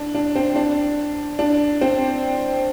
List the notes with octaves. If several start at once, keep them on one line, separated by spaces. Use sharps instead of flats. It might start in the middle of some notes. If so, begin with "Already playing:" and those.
Already playing: D4
D4
C4
D4
D4
C4